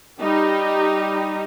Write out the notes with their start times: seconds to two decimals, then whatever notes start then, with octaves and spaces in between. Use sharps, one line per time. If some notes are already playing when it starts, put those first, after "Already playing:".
0.21 G3 D#4 G4